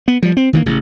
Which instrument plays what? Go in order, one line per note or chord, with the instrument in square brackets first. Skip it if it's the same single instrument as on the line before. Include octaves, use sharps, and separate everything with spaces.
[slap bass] B3
F3 G3
C4
D#3 E3 A#3
A1 C#3